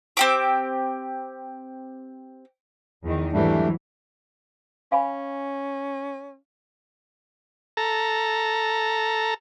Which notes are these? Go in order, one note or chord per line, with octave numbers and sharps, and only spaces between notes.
C4 G4 D6
E2 D#3
G#2 E3 F#3 G3 A3 D4
C#4 F5 G#5 B5
A4 A#5